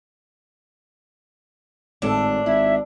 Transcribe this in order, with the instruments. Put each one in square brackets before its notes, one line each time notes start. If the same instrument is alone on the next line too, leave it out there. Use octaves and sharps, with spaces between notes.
[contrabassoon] G#1 [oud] A2 A4 E5 [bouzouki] D4
[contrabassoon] G#1 [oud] E4 [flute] E5